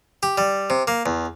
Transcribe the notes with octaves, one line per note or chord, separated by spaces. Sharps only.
G4
G3
C3
A#3
E2